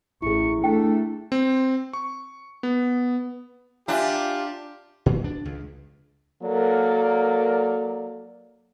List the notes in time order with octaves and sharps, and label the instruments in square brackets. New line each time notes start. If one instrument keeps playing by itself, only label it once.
[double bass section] A1 [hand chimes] E4 G#4 [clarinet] C#6
[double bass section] A3 [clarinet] D4 [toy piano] G5
[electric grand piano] C4
C#6
B3
[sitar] D4 [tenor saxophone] F4 [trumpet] G4 [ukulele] E5 G#5 A#5
[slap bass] A#2
D4
C#2
[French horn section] F#3 A#3 A4 A#4 D5